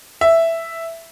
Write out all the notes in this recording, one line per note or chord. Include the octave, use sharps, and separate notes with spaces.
E5